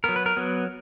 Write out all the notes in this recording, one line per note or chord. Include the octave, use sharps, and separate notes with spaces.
F#3 B3 A#4
B4
A#4
F#3 B3